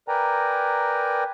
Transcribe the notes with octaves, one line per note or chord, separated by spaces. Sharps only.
A#4 B4 D5 G5 G#5 A#5